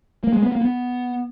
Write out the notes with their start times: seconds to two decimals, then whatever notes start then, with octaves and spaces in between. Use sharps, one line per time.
0.24 A#3
0.33 G#3
0.43 B3
0.52 A#3
0.61 B3